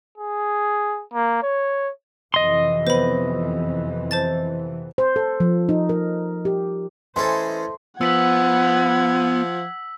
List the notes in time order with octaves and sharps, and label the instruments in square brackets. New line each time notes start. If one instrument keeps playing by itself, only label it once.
[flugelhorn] G#4
A#3
C#5
[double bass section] F2 C3 E3 [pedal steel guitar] D#5 C6
[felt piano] B3 [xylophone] C5 B5
[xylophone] C5 A5 A6
[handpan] C5
A4
F3
D#4
A#4
G4
[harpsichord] E3 C#4 A4 [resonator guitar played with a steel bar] A3 [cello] C5 D#5 [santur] C6
[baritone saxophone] F3 [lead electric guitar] B3 [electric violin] F#5 G#6 [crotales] E6 B6 F#7